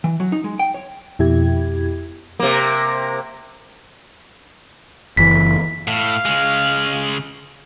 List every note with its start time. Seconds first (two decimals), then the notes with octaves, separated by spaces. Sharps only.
0.04 E3
0.20 F#3
0.32 D#4
0.44 G#3
0.59 G5
0.74 C#5
1.19 F2 B2 E4 G4 G#6
2.39 C3 A#3
5.17 F#1 E3 B6
5.88 A2 F5
6.25 C#3 G#3